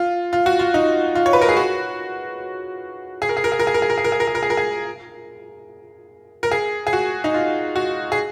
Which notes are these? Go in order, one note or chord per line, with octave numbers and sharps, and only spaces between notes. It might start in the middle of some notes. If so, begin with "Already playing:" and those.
Already playing: F4
F4
F#4
F4
D#4
F4
C#5
B4
A#4
G#4
F#4
G#4
A#4
G#4
A#4
G#4
A#4
G#4
A#4
G#4
A#4
G#4
A#4
G#4
A#4
G#4
A#4
G#4
A#4
G#4
A#4
G#4
G#4
F#4
D#4
F4
F#4
G#4